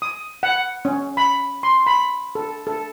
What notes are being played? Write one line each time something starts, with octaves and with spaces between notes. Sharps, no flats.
D#6
F#5
C#4
B5
C6
B5
A4
A4